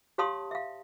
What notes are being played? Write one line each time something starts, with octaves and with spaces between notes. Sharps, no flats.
G4 C#5 F5 A5 C6 D#6
E5 F5